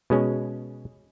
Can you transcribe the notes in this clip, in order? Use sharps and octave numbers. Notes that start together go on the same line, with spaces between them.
B2 G#3 C#4